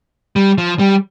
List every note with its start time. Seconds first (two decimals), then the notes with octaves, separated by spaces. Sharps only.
0.36 G3
0.58 F3
0.79 G3